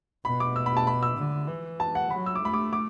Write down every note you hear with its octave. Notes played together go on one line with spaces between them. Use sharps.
B2 B5
D6
E6
B5
A5
B5
E6
D3
E3
A5
F#5
F#3 B5
E6
D6
A3 B5
D6
D6